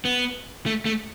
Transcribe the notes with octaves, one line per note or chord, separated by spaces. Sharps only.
B3
A3
A3